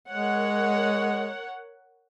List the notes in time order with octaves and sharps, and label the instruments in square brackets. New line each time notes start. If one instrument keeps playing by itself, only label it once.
[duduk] G#3 [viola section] A#4 C#5 F#5